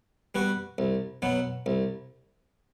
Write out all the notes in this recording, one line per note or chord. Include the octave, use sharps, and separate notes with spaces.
G3 B3 F#4
C2
B2 F#3 B3
C2